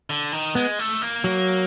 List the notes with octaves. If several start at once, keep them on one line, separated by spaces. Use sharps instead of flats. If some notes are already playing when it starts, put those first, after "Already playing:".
D3
D#3
G#3 B3
A3
A#3
F#3